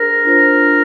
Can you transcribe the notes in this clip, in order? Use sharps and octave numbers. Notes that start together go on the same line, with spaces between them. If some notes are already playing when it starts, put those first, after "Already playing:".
Already playing: D4 G#4 A#4 C5
D4 F4 C5